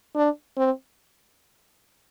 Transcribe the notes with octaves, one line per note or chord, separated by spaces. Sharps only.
D4
C4